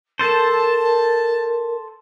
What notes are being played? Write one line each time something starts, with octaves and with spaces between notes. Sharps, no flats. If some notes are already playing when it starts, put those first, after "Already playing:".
A4 A#4 C5 A5